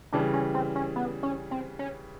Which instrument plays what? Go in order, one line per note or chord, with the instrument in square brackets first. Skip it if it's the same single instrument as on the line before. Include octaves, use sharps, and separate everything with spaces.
[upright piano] C#3 E3 G3 [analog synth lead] D4
[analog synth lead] C#4
C4
C#4
B3
C#4
C4
C#4